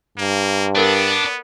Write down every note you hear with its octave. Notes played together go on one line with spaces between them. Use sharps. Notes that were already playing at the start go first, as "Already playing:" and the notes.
G2 A#3
B3 D4 A4 A#4 D5